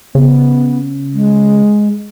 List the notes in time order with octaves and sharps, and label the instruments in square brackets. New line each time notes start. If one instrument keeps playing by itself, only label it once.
[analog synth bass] C#3 [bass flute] B3
[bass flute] G#3